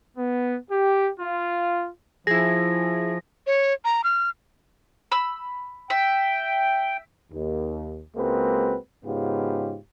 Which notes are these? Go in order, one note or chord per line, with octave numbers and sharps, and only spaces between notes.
B3
G4
F4
F3 E4 G#4 A#6
C#5
A#5
F6
B5 E6
E5 G5
D#2
C#2 G#3 A#3 C4 F#4 B4
G#2 C#3 B3 C#4 F4 G4